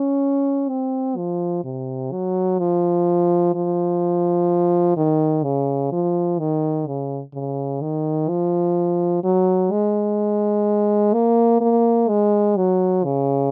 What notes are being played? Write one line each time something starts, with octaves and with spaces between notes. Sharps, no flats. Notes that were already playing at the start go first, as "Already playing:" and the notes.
Already playing: C#4
C4
F3
C3
F#3
F3
F3
D#3
C#3
F3
D#3
C#3
C#3
D#3
F3
F#3
G#3
A#3
A#3
G#3
F#3
C#3